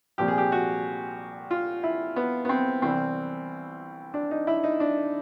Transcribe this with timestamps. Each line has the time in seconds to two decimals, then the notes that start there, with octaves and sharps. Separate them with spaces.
0.18 C2 A#2 F3 G4
0.28 G#4
0.38 G4
0.52 F#4
1.51 F4
1.83 E4
2.16 B3
2.45 B3
2.49 C4
2.82 C2 C3 E3 G3 C4
4.14 D4
4.31 D#4
4.47 E4
4.64 D#4
4.80 D4